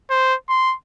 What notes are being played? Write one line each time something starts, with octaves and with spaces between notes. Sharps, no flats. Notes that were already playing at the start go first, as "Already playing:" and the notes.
C5
C6